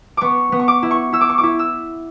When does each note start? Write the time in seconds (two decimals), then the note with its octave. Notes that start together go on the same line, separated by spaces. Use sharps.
0.17 B3 C#6 D6
0.52 B3
0.59 C#6
0.68 D6
0.83 E4
0.91 C#6
1.13 E4 E6
1.21 D6
1.29 C#6
1.38 D6
1.43 E4
1.59 E6